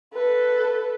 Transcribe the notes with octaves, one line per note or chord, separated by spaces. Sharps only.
A4 B4